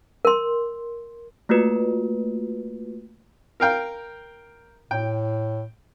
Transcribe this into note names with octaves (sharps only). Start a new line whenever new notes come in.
A#4 C6
A3 A#3 F4 F#4 B4
A#4 F5 G5
A2 G5